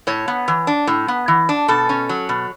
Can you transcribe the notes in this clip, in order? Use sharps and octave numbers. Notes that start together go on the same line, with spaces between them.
A2 C#5
B3
E3
D4
A2
B3
E3
D4
B2 A4
C#4
F#3
B2